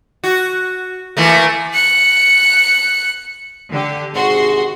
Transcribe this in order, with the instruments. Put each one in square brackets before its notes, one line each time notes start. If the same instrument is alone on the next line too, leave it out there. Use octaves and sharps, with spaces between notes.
[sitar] F#4
E3 A3 A#3
[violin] F#6 C#7
[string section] D3 G4
[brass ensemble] G#1 C3 G#4 [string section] F#4 C6